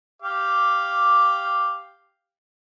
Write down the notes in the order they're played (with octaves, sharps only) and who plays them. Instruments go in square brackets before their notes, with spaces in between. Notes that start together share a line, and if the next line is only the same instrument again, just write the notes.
[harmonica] G4 F5 D6